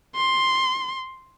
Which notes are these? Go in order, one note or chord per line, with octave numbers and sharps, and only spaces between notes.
C6